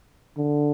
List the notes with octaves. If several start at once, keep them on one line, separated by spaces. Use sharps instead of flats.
D3